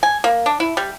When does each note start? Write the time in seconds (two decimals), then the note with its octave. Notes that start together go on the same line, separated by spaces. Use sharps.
0.03 G#5
0.24 A#3
0.46 D4
0.60 E4
0.77 G3